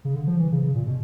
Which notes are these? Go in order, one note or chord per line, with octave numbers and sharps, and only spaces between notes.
C#3
D3
F3
E3
C#3
C#3
A#2
B2